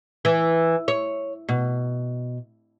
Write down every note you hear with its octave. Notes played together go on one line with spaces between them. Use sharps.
E3
C#5
B2